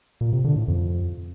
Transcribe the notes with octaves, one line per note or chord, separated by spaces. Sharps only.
A#2
C3
D3
A2
F2